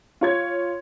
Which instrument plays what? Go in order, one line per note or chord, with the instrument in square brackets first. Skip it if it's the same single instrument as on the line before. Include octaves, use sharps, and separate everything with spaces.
[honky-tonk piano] F4 C#5 G#6